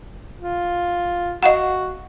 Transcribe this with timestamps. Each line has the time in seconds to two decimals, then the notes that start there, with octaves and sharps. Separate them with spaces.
0.40 F4
1.43 F#4 D#5 F5 F#5